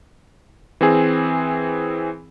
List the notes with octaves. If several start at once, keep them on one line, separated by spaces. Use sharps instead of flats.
E3 C4 G#4